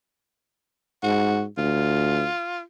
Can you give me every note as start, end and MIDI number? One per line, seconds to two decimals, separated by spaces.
1.03 1.46 44
1.03 1.42 66
1.58 2.25 38
1.58 2.61 65